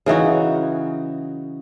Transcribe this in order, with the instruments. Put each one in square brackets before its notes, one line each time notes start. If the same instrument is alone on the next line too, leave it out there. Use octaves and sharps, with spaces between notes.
[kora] C#3 E3 D#4 F#4